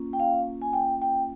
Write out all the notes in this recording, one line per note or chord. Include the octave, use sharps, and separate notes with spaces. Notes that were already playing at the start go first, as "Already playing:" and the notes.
Already playing: A#3 C#4 F4
G5
F5
G#5
G5
G5